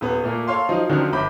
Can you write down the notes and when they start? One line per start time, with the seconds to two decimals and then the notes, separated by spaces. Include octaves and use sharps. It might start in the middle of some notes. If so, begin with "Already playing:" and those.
0.01 D#1 B3
0.24 A#2 A3 A#3
0.48 A4 C#5 F5 C6
0.69 F3 F#3 D#4 F4
0.89 D3 D#3 F3 F#3 C4 C#4
1.13 G1 B5 D6 G6